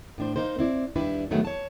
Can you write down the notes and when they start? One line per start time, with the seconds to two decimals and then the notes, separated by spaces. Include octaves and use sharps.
0.18 A2 D4 C5
0.36 A#3 D#4 A#4 C5
0.59 C4 E4 D5
0.95 D#2 G3 D4 E4 B4
1.31 G#2 D#3 F#3 G#3 A3 B3
1.45 C#5 A5